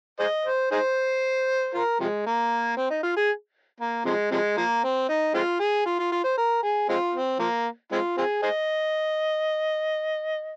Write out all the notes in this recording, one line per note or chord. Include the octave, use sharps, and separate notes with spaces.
G#4 C5 D#5
C5
D#4 G#4 C5
F4 A#4
C3 F3 G#3
A#3
C4
D#4
F4
G#4
A#3
C3 F3 G#3
C3 F3 G#3
F3 A#3
C4
D#4
G#3 C4 F4
G#4
F4
F4
F4
C5
A#4
G#4
G#3 C4 F4
C4
F3 A#3
G#3 C4 F4
C4 F4 G#4
G#4 C5 D#5